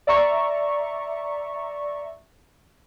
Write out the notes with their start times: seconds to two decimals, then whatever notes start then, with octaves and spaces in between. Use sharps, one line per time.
0.07 D5 E5 A#5 C#6